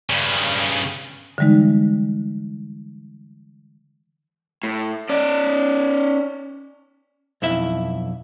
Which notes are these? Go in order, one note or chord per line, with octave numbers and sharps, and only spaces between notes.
G2 C#3
D3 E3 G3 G#3 D#4
A2
C#4 D5
B1 F2 E4 E5